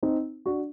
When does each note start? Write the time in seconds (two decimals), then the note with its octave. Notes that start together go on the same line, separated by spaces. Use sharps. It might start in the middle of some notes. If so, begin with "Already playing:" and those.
0.03 C4 D#4
0.46 D4 F#4